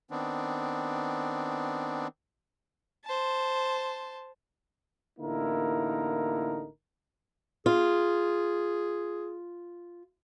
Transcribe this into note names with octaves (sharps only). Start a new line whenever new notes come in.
D#3 B3 C4 D4
C5 A5
A1 D3 A#3 D#4 E4 A#4
F4 G#4